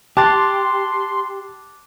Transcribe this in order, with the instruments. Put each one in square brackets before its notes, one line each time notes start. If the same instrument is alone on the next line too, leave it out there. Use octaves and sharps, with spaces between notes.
[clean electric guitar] G4 [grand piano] A5 [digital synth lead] C6 [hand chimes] D6 F#6 A6